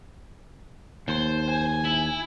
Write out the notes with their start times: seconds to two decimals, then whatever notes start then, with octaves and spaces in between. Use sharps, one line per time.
1.08 D#2 C5
1.49 G#5
1.85 E4